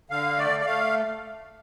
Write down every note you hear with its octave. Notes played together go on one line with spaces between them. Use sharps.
D3 F5
A3 D5
D5
A3 F5